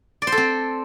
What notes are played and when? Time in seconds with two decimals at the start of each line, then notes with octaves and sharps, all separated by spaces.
0.22 D5
0.27 C5
0.32 A4
0.37 C4